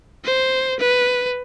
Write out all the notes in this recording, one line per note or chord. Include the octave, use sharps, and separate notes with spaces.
C5
B4